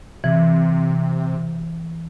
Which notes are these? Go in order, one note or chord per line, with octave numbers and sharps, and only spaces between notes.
C3 E3